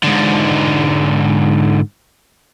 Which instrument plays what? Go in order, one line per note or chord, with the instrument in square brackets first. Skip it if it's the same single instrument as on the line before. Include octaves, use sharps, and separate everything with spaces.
[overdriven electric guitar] G#2 D3